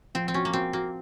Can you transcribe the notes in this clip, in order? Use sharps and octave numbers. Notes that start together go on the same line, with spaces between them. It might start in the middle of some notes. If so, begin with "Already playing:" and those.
F3 C4
C4
C#4 F#4
A#3
C4 F#4
A#3 F#4